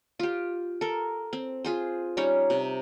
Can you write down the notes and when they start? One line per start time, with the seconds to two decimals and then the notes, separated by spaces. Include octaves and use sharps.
0.19 F4 G4
0.81 A4 A#4
1.33 C4
1.64 F4 G#4 C5
2.17 G3 C#4 D#4 C#5
2.50 C3